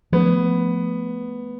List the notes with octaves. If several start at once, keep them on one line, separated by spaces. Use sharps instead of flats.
F3 A3 B3 C#4